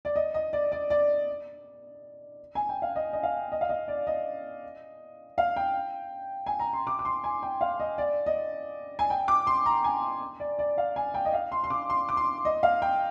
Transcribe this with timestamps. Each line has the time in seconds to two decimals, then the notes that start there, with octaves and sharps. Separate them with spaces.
0.05 D5
0.16 D#5
0.34 D#5
0.53 D5
0.72 D5
0.90 D5
2.55 G#5
2.69 G5
2.82 F5
2.96 D#5
3.13 D#5
3.23 F5
3.52 D#5
3.61 F5
3.69 D#5
3.88 D5
4.07 D#5
5.38 F5
5.56 G5
6.46 G#5
6.60 A#5
6.73 C6
6.87 D6
6.99 D6
7.05 C6
7.24 G#5
7.43 G5
7.61 F5
7.80 D#5
7.98 D5
8.26 D#5
8.99 G#5
9.10 G5
9.28 D6
9.47 C6
9.66 A#5
9.84 G#5
10.40 D5
10.59 D5
10.78 F5
10.96 G#5
11.14 G5
11.25 D#5
11.34 F5
11.52 C6
11.64 C6
11.70 D6
11.90 C6
12.09 D6
12.17 C6
12.45 D#5
12.63 F5
12.82 G5